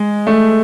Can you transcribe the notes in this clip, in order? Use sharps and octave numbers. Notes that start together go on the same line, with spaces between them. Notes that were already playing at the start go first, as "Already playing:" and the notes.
Already playing: G#3
A3